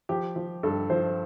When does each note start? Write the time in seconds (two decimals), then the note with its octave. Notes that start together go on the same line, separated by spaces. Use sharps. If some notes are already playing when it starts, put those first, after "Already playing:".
0.09 F3 G4
0.36 F3
0.63 G2 A4
0.90 F3 C5